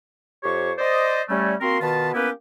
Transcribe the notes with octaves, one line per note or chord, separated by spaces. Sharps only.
F2 G4 C5 C#5 C#6
C5 D5 D#5
G3 A3 C#4
A#3 C4 F#4 A#4 C6
B2 D#3 B3 F4 B4 A5
A#3 B3 C#4 E4 G4 B4